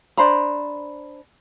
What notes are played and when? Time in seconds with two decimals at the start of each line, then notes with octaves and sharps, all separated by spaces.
0.17 D4 C5 A#5 B5